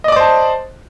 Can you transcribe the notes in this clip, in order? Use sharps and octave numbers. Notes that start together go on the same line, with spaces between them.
C5 D5 D#5 A5 D6